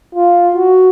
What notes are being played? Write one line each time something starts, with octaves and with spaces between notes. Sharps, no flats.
F4
F#4